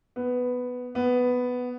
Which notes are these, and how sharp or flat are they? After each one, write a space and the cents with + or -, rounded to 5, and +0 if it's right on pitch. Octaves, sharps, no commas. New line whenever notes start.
B3 +5
B3 +5